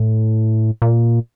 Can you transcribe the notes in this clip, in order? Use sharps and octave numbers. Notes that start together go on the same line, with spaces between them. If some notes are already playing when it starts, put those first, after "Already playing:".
Already playing: A2
A#2